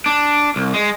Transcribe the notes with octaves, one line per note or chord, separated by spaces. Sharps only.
D4
C2
G#3